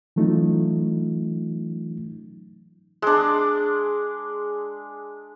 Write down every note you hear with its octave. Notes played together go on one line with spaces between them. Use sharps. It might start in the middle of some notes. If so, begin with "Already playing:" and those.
E3 F#3 A3 C#4 D#4 F4
G#3 D4